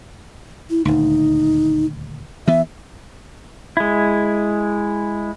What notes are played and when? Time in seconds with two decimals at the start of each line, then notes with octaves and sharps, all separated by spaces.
0.70 E4
0.85 D#1 D2 D#4
2.48 E3 B3 E5
3.77 G#3 E4